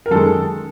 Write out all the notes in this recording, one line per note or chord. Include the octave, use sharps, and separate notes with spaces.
A#4
F#2 D#3 G#3 A4